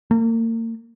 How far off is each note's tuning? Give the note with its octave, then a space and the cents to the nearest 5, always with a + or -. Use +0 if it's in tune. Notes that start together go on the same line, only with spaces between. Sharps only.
A#3 -40